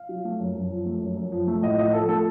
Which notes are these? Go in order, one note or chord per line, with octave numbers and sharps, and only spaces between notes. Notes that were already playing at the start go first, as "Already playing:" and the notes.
Already playing: F5
F#3
A3
F#2
F#2
F3
A3
F#2
F#2
F3
A3
A2 D#5
A2 D#5
F3 A4
A3 A4